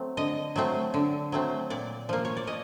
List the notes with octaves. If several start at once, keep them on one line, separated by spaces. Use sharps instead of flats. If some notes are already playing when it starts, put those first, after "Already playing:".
Already playing: F#3 A3 C4
D3 D#5
F#3 A3 C4
D3
F#3 A3 C4
A#2 D5
F3 A#3
C#5
D5
A#2 D#5